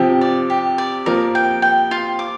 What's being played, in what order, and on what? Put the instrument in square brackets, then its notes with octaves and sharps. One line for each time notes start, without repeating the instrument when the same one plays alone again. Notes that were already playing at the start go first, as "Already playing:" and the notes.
Already playing: [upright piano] C3 F3 [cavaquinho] G4
[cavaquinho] D5
G4
D5
[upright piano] F3 A#3 [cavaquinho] A#4
[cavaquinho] G5
G5
F4
D6